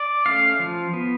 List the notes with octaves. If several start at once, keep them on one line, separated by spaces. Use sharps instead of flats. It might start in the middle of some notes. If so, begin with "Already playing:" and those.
Already playing: D5
A3 C#4 F5
F3
B3